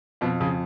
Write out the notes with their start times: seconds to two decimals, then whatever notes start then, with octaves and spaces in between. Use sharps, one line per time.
0.21 F2 B2
0.40 F2 C#3